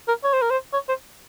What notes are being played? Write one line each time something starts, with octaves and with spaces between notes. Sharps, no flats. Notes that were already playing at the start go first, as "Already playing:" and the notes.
A#4
C#5
C5
A#4
C5
C#5
C5